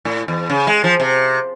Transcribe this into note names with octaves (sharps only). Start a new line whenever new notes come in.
A2
E2
C#3
G#3
F3
C3